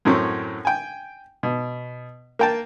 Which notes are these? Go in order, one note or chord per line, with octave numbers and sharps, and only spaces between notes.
F#2 A2 F#3 C4 C#4
G5 G#5
B2
A#3 G5 A5